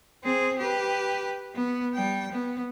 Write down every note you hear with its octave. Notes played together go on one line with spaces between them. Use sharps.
C4 G#4
G4 B4
B3
G3 G5
B3